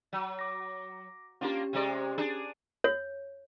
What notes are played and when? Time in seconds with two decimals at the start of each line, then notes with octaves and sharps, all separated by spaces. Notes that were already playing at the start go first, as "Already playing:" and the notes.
0.13 F#3
0.39 D6 A#6
1.41 A#3 C#4 D4 F4 G4
1.73 C3 G#3 D5
2.18 D4 G#4
2.84 C#5